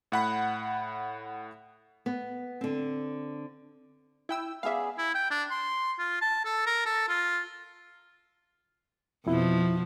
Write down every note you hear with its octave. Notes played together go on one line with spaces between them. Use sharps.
A2 F#5 B5
B3
D3 C4
E4 G5 E6
B3 G#4 D5 E5 F5
E4
G5
D4
C6
F4
A5
A4
A#4
A4
F4
F2 B2 F3 E4